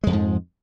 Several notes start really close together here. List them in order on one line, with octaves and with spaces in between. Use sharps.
G#3 F2 F3 G#2